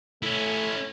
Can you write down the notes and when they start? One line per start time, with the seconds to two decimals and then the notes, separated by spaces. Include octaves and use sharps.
0.23 A3 C#4 E4